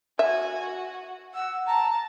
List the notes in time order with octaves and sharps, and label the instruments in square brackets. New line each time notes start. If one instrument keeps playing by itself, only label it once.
[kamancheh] F#4 G#5 [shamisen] E5
[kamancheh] F#4
[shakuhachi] F#5 [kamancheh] E6
[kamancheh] A5 [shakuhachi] A#5